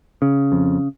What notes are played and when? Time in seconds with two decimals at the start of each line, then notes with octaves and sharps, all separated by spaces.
0.22 C#3
0.52 F2